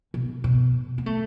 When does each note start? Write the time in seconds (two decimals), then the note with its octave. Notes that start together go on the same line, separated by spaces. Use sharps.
0.14 B2
0.44 B2
0.98 B3
1.06 A3